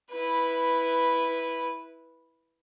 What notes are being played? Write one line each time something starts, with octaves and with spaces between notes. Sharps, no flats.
E4 B4